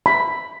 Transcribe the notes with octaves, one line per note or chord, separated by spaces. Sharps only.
B5